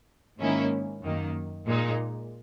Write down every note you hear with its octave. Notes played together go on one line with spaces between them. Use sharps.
G#2 D#3 A#3 C#4 E4
F#2 D#3 A#3
A#2 G#3 D#4